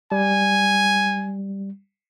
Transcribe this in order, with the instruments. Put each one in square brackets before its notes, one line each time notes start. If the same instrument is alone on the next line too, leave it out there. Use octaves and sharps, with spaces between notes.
[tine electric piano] G3 [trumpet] G#5